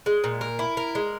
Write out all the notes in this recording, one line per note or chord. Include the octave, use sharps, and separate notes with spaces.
G#3
A#2
A#4
E4
A#4
G#3